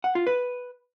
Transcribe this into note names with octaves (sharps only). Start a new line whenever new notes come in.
F#5
F4
B4